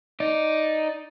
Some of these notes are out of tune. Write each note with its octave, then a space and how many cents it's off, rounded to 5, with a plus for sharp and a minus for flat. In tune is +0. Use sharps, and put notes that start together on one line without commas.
D#4 +0 D5 +0